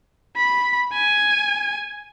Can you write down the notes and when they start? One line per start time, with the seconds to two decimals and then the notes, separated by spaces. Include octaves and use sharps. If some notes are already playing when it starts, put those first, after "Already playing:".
0.36 B5
0.93 G#5